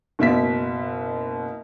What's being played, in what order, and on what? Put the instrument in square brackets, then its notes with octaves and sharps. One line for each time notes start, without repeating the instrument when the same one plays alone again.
[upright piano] F#1 B2 E5 B6